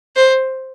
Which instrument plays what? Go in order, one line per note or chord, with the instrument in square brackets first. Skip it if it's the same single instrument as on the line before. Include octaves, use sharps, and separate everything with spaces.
[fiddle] C5